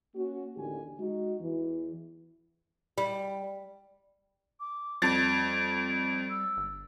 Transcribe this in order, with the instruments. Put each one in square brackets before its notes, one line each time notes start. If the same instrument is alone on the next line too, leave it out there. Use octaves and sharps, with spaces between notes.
[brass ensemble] A#3 C#4 F#4
A1 D#2 D3 G4 G#5
G#3 D#4 F#4
E2 E3
[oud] G3
[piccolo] D6
[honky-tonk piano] F2 A6 [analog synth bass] G3 [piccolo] D7
[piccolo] E6
[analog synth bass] G1